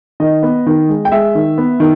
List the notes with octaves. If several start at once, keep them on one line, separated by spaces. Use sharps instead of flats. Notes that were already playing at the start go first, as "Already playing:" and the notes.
D#3 D#5
B3
D#3
G#3
G5
G#3 E5
D#3
B3
D#3